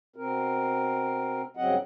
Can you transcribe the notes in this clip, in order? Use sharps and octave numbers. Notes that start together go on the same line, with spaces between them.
B2 C4 A#4
G2 C#3 F#3 C4 D#5 F#5